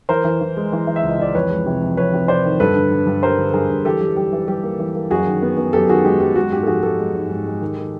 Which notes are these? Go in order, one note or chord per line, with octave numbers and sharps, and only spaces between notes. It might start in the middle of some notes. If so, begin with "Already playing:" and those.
E3 A#4 C5
E3
E3
G#3
E3
E3
E5
C#2
D#5
E3 D5
F2 B4 C#5
G#3
C3
F2
F2 B4 C#5
C3
C3 C5 D5
D#3
G2 A4 B4
D3
D3
G2
G3 A#4 C5
D3
G2 G#4 A#4
G2
E3 G4 A4
G3
G3 G4
E3
G3 G4
A#3
E3
A#3
F#2 F#4 G#4
D#3
B3
B3
F#2 G4 A4
D#3 F#4 G#4
G#3 G4
F#2 G4
G#3 F#4
G#2 G4
A4
F3 F#4 G#4
G#3 G4 A4
G#3
G#2
G#2
G#3
D#3
D#3